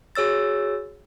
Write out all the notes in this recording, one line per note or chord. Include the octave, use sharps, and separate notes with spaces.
F#4 G#4 C#5 E6 A6